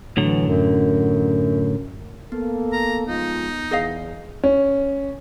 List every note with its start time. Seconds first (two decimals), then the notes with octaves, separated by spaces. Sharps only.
0.17 A2 D3 E3 F#3
0.46 F#2
2.32 A#3 B3 A4
2.72 A#5
3.08 F3 G#3 D#4 F4
3.71 E2 G#4 D#5 F5
4.44 C#4